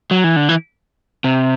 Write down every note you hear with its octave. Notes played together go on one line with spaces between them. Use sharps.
F#3
E3
D3
E3
C3